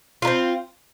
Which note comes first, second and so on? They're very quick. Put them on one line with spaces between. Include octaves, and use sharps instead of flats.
F4 D#4 C4